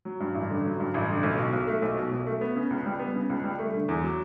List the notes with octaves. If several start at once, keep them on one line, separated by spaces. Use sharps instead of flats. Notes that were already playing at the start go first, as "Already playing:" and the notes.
F#3
G2
A1
D3
F#3
G2
A1
D3
B1
B2
B1
A3
B1
B2
B1
A3
B3
C#3
C#2
G3
B3
C#3
C#2
G3
A3
D3
E2
F#3